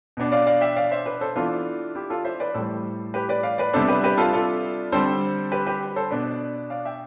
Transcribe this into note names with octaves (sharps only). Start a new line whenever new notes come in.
B2 B3 D4
D5 F5
D5 F5
E5 G5
D5 F5
C5 E5
B4 D5
A4 C5
E3 B3 D4 F4 A4
E4 G4
F4 A4
C5 E5
B4 D5
A2 E3 G3 A4 C5
G4 B4
B4 D5
D5 F5
B4 D5
C3 G3 B3 D4 A4 C5
G4 B4
G4 B4
F4 A4
F4 A4
D3 G3 C4 A4 C5
G4 B4
G4 B4
A4 C5
B2 B3 D4 B4 D5
D5 F5
E5 G5